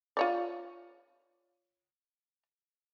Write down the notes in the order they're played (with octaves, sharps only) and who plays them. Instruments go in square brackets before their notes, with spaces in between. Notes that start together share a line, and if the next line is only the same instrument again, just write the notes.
[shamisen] F4 C#5 D5